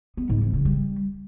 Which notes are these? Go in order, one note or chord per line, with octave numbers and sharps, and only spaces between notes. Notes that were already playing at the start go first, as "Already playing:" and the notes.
B3
G#2
E3
C#3
G3